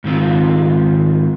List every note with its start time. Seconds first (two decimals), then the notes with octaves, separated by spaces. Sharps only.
0.04 G#2 D#3 C4 F4